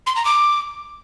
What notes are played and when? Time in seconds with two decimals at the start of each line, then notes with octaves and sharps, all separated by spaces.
0.07 C6
0.16 A#5
0.25 D6